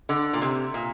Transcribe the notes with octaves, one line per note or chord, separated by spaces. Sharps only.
D3
A#2
C3
A#2